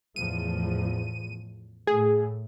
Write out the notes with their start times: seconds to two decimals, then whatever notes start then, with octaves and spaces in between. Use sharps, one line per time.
0.16 E2 A2 F3 D#7
1.87 A2 A3 G#4